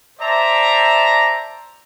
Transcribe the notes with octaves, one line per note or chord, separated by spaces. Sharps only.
C5 D5 E5 A5 A#5